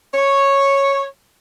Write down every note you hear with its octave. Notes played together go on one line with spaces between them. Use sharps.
C#5